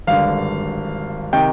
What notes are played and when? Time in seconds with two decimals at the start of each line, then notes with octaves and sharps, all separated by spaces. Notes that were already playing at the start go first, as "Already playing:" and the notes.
0.07 G#1 G2 D3 F5
1.33 C3 D#3 G5